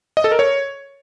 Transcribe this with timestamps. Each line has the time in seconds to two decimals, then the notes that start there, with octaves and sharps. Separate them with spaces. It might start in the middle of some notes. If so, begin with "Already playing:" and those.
0.17 D#5
0.24 A4
0.32 A#4
0.39 C#5